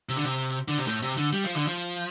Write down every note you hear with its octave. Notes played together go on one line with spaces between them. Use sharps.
C3
D3
C3
D3
C3
A2
C3
D3
G3
F3
D3
F3